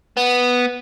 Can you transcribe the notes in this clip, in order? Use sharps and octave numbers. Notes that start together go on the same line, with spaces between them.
B3